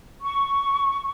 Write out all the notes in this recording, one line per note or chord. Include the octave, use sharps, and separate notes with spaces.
C#6